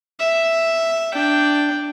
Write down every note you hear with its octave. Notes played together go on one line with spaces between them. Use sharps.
E5
D4 G5